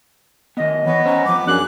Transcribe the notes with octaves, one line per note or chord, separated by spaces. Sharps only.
D#3 B3 D#5
E3 B3 C#5
C#4 C5 C#5 A#5
G2 F3 D6
F#2 D4 G#4 F#6